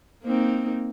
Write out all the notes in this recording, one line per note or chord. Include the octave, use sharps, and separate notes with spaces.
A#3 C4 D#4